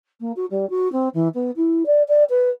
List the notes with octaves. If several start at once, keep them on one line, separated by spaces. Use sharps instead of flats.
A#3
F#4
G3
F#4
C4
E3
B3
E4
D5
D5
B4